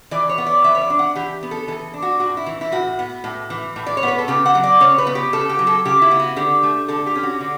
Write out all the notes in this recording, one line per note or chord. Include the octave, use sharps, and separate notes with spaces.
E3 D5
C#5
B3
D5
E3 E5
C#5
D5
D4
F#5
E3 G4
B3
A4
E3 A4
D4
F#4
A2 F#4
E4
E3
E4
A2 F#4
B3
A2
E3
A2
D5
C#5
B3
B4
A4
C#3 G4
F#5
F#3
D5
C#3 C#5
B4
B3
G4
C#3 A4
G4
F#3
A4
C#3 G4
E4
B3
F#4
D3 G4
A3
D3 A4
G4
C#4
F#4
D3